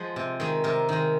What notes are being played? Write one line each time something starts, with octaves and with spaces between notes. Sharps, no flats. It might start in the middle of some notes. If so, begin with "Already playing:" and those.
Already playing: F3 G#3 G#4 F#5
C3
D#3 G#3
C3 A#4
D#3 G#3